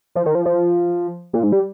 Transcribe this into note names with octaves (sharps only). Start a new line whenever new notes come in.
F3
D#3
F3
F3
A#2
G#2
G3